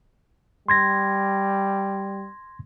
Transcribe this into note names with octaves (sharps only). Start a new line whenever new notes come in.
G3 C6 G#6 A#6